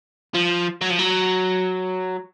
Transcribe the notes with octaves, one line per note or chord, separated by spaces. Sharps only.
F3
F#3
F3
F#3